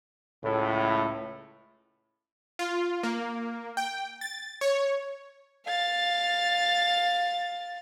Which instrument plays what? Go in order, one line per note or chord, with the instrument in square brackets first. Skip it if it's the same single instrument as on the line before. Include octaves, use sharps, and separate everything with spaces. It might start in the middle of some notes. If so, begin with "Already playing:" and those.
[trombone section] C#2 A2
[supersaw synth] F4
A#3
G5
A6
C#5
[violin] F5 A6